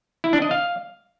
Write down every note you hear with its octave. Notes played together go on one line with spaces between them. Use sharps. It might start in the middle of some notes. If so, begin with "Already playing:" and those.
E4
D4
D#5
F5